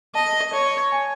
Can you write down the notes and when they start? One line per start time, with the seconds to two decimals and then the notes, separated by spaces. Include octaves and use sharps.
0.14 D#5 A5
0.53 C#5
0.92 G#5